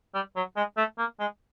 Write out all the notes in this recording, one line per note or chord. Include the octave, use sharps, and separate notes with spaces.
G3
F#3
G#3
A3
A#3
G#3